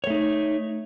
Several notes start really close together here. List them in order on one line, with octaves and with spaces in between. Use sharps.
C#5 A3 D#4